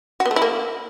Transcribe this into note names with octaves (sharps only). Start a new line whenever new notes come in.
F#4
B3
A3
E4
A#3